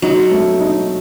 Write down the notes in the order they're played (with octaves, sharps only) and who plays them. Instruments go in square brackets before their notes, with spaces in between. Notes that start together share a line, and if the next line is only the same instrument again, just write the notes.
[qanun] F#3 [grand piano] D#4
[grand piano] A3
D#4